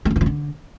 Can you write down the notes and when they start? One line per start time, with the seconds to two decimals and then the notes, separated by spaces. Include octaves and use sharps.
0.05 A3
0.11 F#3
0.16 E3
0.21 F3
0.26 D3